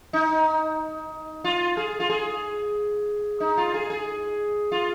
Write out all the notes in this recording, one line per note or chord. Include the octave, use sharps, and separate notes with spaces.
D#4
F4
G#4
F4
G#4
D#4
F4
G#4
G#4
F4